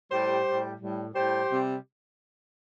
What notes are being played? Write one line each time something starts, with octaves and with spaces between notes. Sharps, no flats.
A2 G3 G4 C5
A2 G3
A2 G3
A2 G3 G4 C5
C3 G3